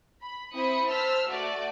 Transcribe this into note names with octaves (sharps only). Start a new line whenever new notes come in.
B5
C4 E4 B5 D#6 C#7
C5 A5 E6 F6 B6
A3 F#4 D5